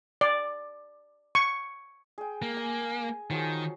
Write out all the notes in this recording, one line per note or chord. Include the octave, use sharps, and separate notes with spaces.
D5
C#6
G#4 G5
A#3
G#5
D#3 F3 F#3 G#4